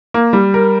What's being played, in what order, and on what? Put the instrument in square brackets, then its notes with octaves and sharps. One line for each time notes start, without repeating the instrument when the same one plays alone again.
[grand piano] A#3
G3
A#4